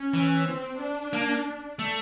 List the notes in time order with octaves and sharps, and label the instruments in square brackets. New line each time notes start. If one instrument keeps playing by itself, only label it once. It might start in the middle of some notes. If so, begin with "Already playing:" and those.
Already playing: [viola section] C#4
[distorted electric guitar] E3
[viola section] C4
D4
[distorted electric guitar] A#3
A3